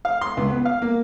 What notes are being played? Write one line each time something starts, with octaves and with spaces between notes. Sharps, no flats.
F5
C6
C#2
B3
F5
A#3